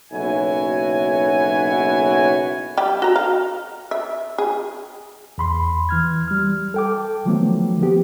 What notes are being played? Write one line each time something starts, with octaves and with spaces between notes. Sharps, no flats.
F#1 B1 E4 F#4 C#5 G#5
G3 G4
F#4 A#5
F5
E5
G#4
E2 B5 C6
E3 F6 G#6
G3 F6
A4 G5 D6
D3 D#3 F3 F#3 A3 B3
F3 B3 G4